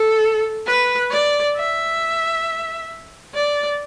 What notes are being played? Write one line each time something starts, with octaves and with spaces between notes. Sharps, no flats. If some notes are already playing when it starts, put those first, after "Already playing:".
Already playing: A4
B4
D5
E5
D5